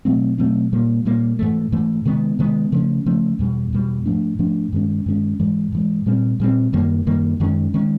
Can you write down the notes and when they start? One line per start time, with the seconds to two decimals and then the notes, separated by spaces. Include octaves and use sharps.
0.05 B2 F#3 A3 C4
0.38 B2 F#3 A3 C4
0.73 A#2 G3 A#3
1.05 A#2 G3 A#3
1.39 G#2 E3 A3
1.72 G#2 E3 A3
2.05 C3 D#3 G#3 B3
2.39 C3 D#3 G#3 B3
2.72 C#3 F3 A3 C#4
3.06 C#3 F3 A3 C#4
3.39 E2 B2 G3
3.73 E2 B2 G3
4.06 G#2 F3 A3 D4
4.39 G#2 F3 A3 D4
4.73 G2 D#3 G#3 C#4
5.06 G2 D#3 G#3 C#4
5.40 G#2 E3 G#3
5.72 G#2 E3 G#3
6.06 A#2 G3 C4
6.40 A#2 G3 C4
6.73 F#2 D#3 G3 A#3
7.07 F#2 D#3 G3 A#3
7.40 F#2 D#3 G#3 C#4
7.74 D#3 G#3 C#4